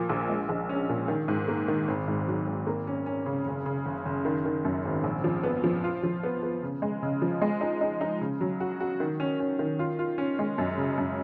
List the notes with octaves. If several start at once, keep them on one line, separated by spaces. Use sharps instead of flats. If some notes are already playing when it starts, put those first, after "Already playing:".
Already playing: A#2 F3 A#3
A#1
G#3
A#1
C#4
A#2
D#3
G#2
A#3
D#3
G#1
G#2
F#3
G#1
A#3
C#4
C#4
C#3
F#1
C#3
F#1
F#1
D#3
D#3
F#2
G#1
A#1
F3
B3
F3
F4
F3
B3
B3
C#3
G#3
C#3
F3
G#3
D#4
D#4
D#4
C#3
F#3
F#4
F#4
D#3
C#4
C#4
D#3
F4
F4
C#4
G#3
F#2
C#3
F#2